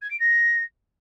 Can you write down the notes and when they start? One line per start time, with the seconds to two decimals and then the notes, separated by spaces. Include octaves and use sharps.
0.01 G#6
0.10 D7
0.19 A#6